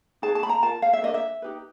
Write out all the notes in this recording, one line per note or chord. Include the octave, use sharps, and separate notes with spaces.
D#4 G#4 B4 A5
A5
B5
A#5
F4 A#4 A5
F5
E5
D4 F4 A#4 D#5
E5
D#4 G4 B4